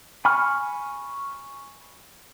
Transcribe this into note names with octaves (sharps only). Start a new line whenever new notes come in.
G#5 B5 C#6 F6